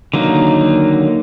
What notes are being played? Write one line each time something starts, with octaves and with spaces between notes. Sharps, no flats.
D3 D#3 F#3 A#3 D#4